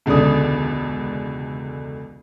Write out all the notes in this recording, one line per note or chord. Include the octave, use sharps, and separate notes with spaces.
E1 C#2 D3 D5 D#6